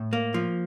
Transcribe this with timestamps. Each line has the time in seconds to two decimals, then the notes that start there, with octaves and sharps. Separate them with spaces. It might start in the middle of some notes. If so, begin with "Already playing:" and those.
Already playing: A2
0.13 A#3
0.34 F3